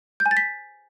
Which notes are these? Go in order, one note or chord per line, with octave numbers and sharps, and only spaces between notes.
G6
G#5
A6
B6